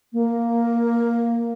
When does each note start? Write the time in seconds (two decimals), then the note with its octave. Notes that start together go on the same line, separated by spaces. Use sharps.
0.13 A#3